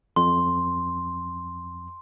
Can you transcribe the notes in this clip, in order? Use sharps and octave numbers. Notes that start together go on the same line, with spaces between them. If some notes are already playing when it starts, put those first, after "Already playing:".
F2 C6